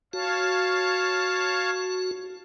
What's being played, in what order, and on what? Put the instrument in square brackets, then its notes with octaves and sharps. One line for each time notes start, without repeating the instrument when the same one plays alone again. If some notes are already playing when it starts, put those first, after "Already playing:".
[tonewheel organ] F#4 [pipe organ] C#5 F5 A5